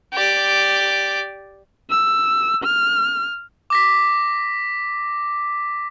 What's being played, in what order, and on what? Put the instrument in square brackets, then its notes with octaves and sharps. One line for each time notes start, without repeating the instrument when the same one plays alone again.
[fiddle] G4 D5
[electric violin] E6
F6
[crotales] D6 A#6 B6